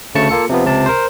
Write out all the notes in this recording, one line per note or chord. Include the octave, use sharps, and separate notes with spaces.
D2 C#3 A3 A5 C#6 C#7
A#3 F4 A4 C#7
C3 F3 B3
C#2 C3 A5
A#4 C5